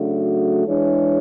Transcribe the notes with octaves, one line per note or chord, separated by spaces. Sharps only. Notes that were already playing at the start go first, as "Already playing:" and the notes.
Already playing: C#3 F#3 A3 D4 F#4
E3 G#3 D4 G#4 C#5